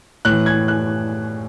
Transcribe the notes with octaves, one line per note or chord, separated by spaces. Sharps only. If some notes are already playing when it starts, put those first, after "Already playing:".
A2 E3 F#6
G#6
F#6